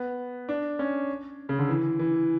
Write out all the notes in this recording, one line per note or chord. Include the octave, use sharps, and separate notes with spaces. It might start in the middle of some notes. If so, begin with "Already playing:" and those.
Already playing: B3
D4
C#4
C#3
D3
E3
E3